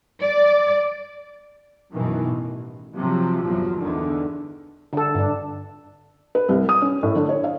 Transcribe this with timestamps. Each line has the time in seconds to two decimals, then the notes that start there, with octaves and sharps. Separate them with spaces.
0.22 D5
1.92 F#2 B2 D#3 E3
2.26 A1
2.95 C3 F3 F#3
3.42 G1 E2 F3 F#3
3.79 E2 D3 D#3
4.93 D3 A4
5.15 G2 D3 D4
6.35 B4
6.49 C2
6.69 D#6
6.82 C#4
7.03 A2
7.15 D3
7.29 C#5
7.44 F5